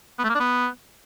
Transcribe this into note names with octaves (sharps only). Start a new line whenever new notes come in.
B3
A3
A#3
D4
B3